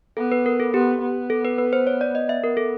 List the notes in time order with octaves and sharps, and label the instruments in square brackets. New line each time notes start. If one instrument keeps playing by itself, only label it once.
[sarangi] B3 [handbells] A4
[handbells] B4
A#4
A4
[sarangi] B3 [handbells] G4
[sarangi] B3
[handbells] A4
B4
B4
C5
C#5
D5
D#5
E5
[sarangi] B3 [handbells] A#4
[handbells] A4